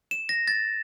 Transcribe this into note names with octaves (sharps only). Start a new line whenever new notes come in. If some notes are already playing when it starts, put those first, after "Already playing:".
E7
A#6
A6